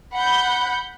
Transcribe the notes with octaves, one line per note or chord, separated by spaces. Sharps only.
F#5 B5 G6